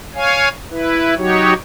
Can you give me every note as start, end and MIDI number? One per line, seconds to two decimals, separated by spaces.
0.15 0.49 73
0.15 0.49 77
0.15 0.49 80
0.70 1.14 64
0.70 1.14 71
1.17 1.54 54
1.17 1.54 63
1.17 1.54 66
1.17 1.54 67
1.17 1.54 73